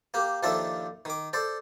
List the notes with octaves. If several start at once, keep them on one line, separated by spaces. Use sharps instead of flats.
A#3 G4
D#2 D#3 F3 D4 A4 E5
D#3 D6
A4 C5 D5